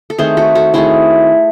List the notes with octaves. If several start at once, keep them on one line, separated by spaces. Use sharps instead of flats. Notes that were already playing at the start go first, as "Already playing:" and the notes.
A4
D#3 A3 C4 G#4 C5
F#4 A4
F#4 A4
D#3 A3 C4 E4 G#4